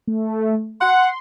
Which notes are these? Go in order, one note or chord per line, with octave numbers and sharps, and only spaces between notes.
A3
F#5 C6